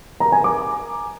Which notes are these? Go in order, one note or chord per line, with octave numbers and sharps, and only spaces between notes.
A#5
G#5
D6